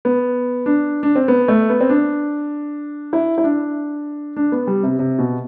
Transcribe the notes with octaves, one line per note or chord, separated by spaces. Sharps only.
B3
D4
D4
C4
B3
A3
B3
C4
D4
E4
E4
D4
D4
B3
G3
C3
C3
B2